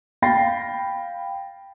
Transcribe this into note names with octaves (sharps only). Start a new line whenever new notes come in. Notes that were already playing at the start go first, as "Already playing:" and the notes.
F5 G5 B5 A6 A#6 C7